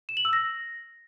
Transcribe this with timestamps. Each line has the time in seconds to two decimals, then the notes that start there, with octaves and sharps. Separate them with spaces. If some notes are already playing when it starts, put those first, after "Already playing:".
0.09 E7
0.17 F#7
0.25 E6
0.33 A#6